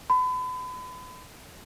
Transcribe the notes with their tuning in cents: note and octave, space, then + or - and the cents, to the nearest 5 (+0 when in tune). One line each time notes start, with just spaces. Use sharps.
B5 +35